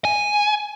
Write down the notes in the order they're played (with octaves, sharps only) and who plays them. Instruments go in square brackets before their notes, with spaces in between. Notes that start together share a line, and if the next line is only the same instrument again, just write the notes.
[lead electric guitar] G#5